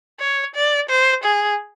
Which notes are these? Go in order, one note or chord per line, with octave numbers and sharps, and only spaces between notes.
C#5
D5
C5
G#4